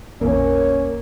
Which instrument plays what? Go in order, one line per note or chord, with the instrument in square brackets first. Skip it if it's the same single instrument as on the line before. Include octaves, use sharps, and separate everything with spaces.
[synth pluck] A1 E2 A#2 [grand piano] A#3 [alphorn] C#4 [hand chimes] A#4